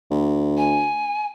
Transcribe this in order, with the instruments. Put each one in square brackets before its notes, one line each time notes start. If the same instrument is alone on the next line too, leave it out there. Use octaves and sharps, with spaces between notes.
[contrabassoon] D2
[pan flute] G#5